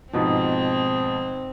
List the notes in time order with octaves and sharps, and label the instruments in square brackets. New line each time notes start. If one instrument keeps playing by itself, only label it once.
[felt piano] G#2 B2 F3 [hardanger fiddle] C4